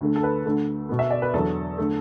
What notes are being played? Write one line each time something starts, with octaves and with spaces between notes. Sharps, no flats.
D2 D3 A3
A4
B4
D2 D3 A3
B2 B3
E5
D5
B4
E2 D3 F#3 A4
D3 A3